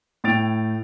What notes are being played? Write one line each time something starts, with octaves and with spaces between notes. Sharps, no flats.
A2 G5 A6 D7 F7